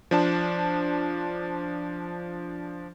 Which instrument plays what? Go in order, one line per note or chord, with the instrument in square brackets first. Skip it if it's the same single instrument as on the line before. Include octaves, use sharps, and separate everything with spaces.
[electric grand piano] F3 D4 A5